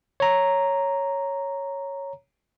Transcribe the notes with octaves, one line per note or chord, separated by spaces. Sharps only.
C#5 A#5